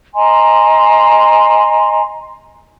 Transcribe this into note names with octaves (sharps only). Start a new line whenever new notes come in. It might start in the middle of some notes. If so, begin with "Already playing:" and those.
D#5 G#5 A#5 C6